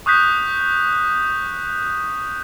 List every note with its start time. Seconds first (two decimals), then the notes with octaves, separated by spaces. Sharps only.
0.06 C#6 D#6 F#6 G6 B6